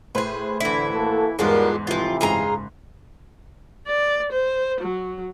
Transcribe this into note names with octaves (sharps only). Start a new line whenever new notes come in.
A2 G#4 B4 C5 C6
D3 E3 E4
A#3 F#4 A4
E2 G#2 G3 G#3 B3 D4 F4 A#4
A2 C3 E3 F3 F4
F#1 G#2 F4 G#4 A#5
D5
C5
F#3